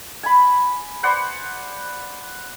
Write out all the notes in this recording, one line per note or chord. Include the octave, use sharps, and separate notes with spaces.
G#5 B5
B4 C5 D5 F#5